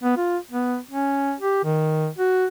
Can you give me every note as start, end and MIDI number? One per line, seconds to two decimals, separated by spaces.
0.03 0.15 59
0.17 0.38 65
0.51 0.77 59
0.91 1.33 61
1.40 1.61 67
1.64 2.09 51
2.18 2.46 66